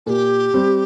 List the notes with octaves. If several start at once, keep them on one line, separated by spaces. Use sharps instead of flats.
A#2 G4 A4
G3 C4